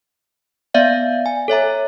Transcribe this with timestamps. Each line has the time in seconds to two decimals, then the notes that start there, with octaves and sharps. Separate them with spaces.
0.74 B3 D5 E5 F5
1.26 G#5
1.48 A4 C#5 E5 A#5